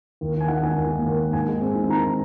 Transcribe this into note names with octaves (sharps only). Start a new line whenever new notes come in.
D#2
D#2
G#5
D#3 F#5
D#3 G#5
D#2
A#3
D#2
A#3
G#2 G#5
G#3
C4
D#3
D#3 A#5